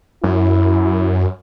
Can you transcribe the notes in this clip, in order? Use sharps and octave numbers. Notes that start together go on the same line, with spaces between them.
F#2 E4